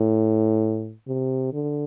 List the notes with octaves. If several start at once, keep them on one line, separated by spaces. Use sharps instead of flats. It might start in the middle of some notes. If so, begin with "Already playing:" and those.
Already playing: A2
C3
D3